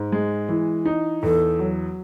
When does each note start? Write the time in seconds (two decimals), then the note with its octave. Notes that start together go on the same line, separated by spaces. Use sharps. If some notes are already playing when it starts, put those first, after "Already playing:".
Already playing: G#2
0.12 G#3
0.49 E3
0.85 D#4
1.23 E2 A4
1.59 F#3